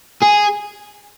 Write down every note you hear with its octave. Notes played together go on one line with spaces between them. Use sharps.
G#4